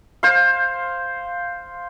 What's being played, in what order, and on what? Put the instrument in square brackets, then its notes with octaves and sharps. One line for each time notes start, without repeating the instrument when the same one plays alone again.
[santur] C5 F5